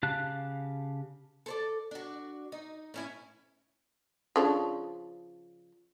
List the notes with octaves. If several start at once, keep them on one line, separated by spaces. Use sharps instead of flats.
C#3 G4 F5 A5 F#6
A4 C5 D5
D4 F#4
D#4
A2 C#4 E4
C#3 F3 D4